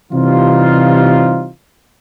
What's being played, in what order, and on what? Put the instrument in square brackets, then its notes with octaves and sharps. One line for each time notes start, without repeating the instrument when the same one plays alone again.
[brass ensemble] C3 E3 G3 C4 D#4 F4